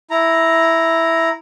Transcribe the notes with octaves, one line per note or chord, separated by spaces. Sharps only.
E4 A#5